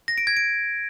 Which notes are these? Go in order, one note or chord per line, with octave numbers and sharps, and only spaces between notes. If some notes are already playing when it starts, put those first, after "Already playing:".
A#6
D7
G#6
D7